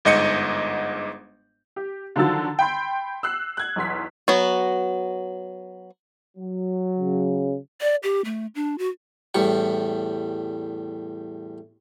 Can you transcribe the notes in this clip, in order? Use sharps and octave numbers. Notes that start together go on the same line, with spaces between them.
G1 G#2 D#5 G6 C#7
G4
D3 D#3 F3 F#3 E6 A6
G5 B5 C6 G6
E6 F#6 C7
F#6 G#6
B1 E2 C6 B6
F#3 B3 F#4
F#3
C#3
D5
G4
A3
D4
F#4
E2 A2 G3 C#6